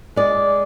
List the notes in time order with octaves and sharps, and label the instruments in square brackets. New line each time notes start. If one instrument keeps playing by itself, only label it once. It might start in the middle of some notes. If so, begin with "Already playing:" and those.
[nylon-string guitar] G#3 D5